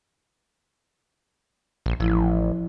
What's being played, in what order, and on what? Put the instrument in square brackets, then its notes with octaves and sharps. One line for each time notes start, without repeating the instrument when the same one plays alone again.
[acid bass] A#1
[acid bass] A1 [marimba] F3 E4